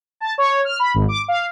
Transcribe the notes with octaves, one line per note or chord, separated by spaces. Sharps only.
A5
C#5
F6
B5
G#1
D6
F5